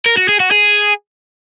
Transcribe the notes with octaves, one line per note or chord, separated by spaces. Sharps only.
A#4
F#4
G#4
F#4
G#4